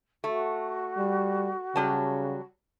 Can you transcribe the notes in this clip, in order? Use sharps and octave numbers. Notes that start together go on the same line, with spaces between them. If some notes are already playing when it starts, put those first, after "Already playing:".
A3 F#4
G3
C#3 F#3 G3 A5